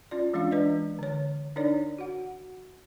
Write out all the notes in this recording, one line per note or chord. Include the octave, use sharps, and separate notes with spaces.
C#4 F4 D5
E3 G#3 C#4 D4 F4 F5
E3 G#3 D4 B4 D5 D#5
D3 C#5
D4 D#4 A#4 C#5 D5
F#4 F#5